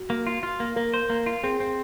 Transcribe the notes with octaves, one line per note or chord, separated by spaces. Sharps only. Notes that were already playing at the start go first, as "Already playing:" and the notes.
Already playing: F#4
A#3
F4
F4
A#3
A#3 A#4
C5
A#3
F4
C4 G#4
C4